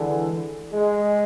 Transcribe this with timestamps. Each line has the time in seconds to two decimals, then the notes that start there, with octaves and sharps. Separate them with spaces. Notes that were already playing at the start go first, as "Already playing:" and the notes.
Already playing: D3 E3 G#3
0.73 G#3